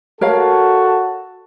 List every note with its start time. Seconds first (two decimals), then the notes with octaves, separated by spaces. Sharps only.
0.21 F#4 A4 A#4 C#5 F5 A5